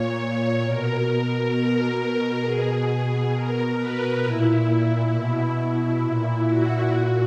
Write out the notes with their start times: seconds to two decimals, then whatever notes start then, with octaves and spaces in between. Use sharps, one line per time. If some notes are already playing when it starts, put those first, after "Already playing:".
Already playing: A#2 C#5
0.63 B2 A#4
1.53 B2 A#4
2.44 B2 G#4
3.33 B2 A#4
3.78 B4
4.23 A#2 E4
4.69 E4
5.13 B2
5.59 E4
6.04 A#2
6.48 F#4
6.94 A#2